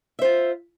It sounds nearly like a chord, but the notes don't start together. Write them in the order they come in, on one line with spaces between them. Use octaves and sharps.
E5 C5 F4